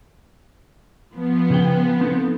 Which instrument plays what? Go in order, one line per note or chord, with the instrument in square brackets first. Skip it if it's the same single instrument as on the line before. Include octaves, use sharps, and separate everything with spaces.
[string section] F3 B3
[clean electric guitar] C#3 G#4 G5
C4 D#4 A4